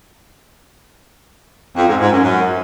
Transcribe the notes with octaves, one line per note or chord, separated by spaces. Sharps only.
F2
G#2
G#2
F#2
F#2